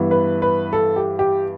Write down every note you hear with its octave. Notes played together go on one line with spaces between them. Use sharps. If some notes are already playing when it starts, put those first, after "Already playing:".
Already playing: G2 E3 B3
B4
B4
A4
G4
G4